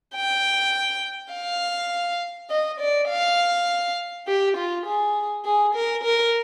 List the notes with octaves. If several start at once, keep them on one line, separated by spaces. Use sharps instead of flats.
G5
F5
D#5
D5
F5
G4
F4
G#4
G#4
A#4
A#4